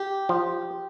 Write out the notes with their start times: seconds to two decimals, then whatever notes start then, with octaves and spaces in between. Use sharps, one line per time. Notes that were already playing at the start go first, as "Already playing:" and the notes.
Already playing: G4
0.29 F3